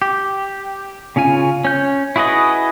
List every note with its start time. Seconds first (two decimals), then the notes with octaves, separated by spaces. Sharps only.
0.02 G4
1.16 C#3 C#4 F4 G#5
1.65 C#4 G6
2.16 E4 F#4 G#4 B4 D#5